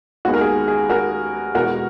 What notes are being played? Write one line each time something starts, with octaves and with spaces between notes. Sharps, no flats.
D#2 D#3 G#3 B3 F#4
A#4
G#4
G#4
F#4 A#4
E2 B2 G#3 B3 F#4 A#4